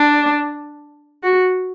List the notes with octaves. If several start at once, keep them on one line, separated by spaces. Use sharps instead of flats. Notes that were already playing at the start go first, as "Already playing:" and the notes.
Already playing: D4
F#4